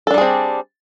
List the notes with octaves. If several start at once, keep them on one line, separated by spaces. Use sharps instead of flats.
G3 C4 D4 G#4 A4